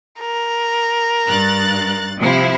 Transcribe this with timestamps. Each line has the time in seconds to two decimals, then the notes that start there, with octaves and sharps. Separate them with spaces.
0.20 A#4
1.28 G2 F#6 A6
2.20 C3 F3 E4